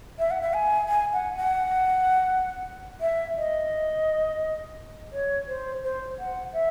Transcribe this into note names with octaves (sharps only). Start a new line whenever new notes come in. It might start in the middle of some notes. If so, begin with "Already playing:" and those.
E5
F#5
E5
G#5
G#5
F#5
F#5
E5
D#5
C#5
C5
C5
F#5
E5